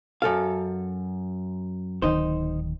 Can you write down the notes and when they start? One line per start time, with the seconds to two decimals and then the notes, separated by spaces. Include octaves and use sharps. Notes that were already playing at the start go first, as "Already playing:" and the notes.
0.22 F#2 A4 F5
2.02 D1 D#3 D#4 C5